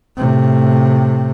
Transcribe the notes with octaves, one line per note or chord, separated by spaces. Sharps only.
A2 C3